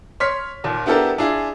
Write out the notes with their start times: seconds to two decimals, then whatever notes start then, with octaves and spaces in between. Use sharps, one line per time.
0.20 C#5 C6 F6 B6
0.64 D#2 A#2
0.86 B3 D4 E4 G4 A4 A#4
1.18 D4 E4 F4 G#4